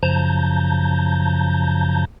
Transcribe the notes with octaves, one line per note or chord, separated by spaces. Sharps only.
F#2 C#3 F3 A5 A#5 G6